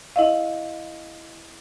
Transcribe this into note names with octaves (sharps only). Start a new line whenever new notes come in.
E4 D#5 F5